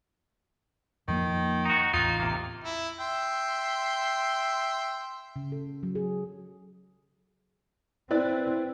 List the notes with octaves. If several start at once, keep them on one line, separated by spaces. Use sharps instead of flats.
F2 D#3 F3 A#3
D#4 F#4
A1 E2 D#4 F4
C3 A#3
E4
E5 G5 C6
C#3
A4
F#3
G#4
C4 E4 B4 D5